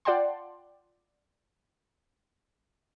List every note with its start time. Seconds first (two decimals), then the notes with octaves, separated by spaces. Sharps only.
0.05 F4 D5 F#5 G5 A5 C6